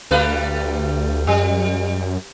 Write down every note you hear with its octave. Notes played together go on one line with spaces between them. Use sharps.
D2 G3 A3 B4
F#2 G3